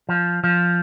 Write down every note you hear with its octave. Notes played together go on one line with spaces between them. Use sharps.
F3
F3